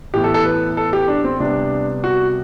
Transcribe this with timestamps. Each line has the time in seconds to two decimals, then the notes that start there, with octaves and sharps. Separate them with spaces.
0.14 A2 E3 B3 G4
0.24 A4
0.34 A4
0.44 B4
0.77 A4
0.93 G4
1.08 D4
1.24 C4
1.40 C3 G3 B3 D4
2.04 F#4